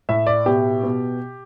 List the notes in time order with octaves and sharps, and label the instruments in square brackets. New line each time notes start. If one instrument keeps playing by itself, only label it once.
[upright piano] A2 E5
D5
B2 G4
B2